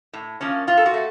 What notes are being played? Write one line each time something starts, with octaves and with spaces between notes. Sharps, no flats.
A2
F3 A#3 C#4
A#2 F4
A4
F#4
A3